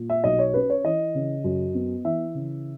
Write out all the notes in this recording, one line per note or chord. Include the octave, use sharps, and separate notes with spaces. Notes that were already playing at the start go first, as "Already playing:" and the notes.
Already playing: A#2
E5
B1 D#5
C#5
C#4 B4
C#5
E3 D#5
C#3
F#2
B3
E3 E5
C#3